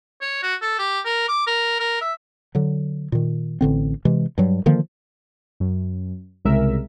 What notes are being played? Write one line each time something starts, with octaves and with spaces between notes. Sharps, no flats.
C#5
F#4
A4
G4
A#4
D6
A#4
A#4
E5
D3 F#3
A#2 D#3
A1 D3 C4
C3 E3 G#3
G2 F#3
D3 D#3 F3 A#3
F#2
C2 C#3 G#3 A#4 E5